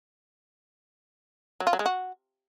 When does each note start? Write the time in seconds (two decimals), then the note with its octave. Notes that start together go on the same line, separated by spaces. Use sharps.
1.60 F#3
1.67 F4
1.73 F#3
1.79 G#3
1.86 F#4